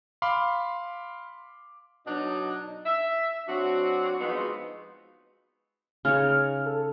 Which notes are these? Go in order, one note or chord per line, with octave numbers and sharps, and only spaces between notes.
F5 B5 C6 D6
B2 F#3 D4 D#4
E5
F#3 C4 D4 F#4
F3 G#3 B3 C4 D#4 F#4
C#3 D#4 C#5 F6
A4